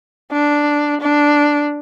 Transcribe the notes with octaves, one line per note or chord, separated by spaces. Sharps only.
D4
D4